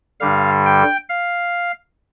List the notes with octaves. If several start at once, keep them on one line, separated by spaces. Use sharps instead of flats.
G2 D3 G3 F5
G5
F5